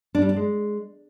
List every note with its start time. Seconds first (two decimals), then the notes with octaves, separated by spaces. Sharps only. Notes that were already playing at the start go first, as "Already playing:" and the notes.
0.15 D4
0.22 G3
0.29 D4
0.36 G#3